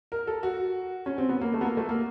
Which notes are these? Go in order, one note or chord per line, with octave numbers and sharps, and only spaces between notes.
A#4
A4
F#4
C#4
C4
B3
A#3
A3
B3
A#3
A3
A#3